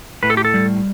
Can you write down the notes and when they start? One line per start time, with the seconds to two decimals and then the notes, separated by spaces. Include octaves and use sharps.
0.23 A2 B4
0.30 A4
0.37 G4
0.45 A4
0.54 G3